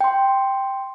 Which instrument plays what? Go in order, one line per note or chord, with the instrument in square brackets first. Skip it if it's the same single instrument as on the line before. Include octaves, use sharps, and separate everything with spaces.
[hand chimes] G5 C6